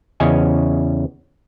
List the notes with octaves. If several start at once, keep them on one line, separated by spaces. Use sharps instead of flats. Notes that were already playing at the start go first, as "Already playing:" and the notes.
E2 C#3 C#4 C#5 D#5 G#5